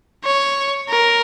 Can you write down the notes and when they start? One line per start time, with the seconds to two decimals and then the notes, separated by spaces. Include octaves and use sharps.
0.24 C#5
0.89 A#4